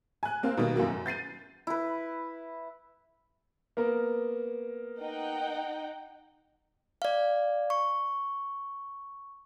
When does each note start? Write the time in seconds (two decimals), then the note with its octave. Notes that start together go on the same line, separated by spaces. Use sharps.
0.23 G#5 F#6
0.43 A#3 C4 F5
0.57 B2 D#3 G3 A#3
0.76 F#2 A2 A#3 F#4
0.89 F#2
1.06 G6 A6 C7 D#7
1.67 E4 B4
3.77 A#3 B3 A#4
5.01 D#4 F#5 G5
7.02 D5 F5
7.70 C#6